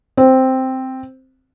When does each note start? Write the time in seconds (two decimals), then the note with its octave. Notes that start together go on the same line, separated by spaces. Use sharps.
0.17 C4